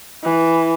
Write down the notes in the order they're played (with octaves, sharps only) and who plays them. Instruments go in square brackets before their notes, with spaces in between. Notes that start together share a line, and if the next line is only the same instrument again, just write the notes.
[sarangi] E3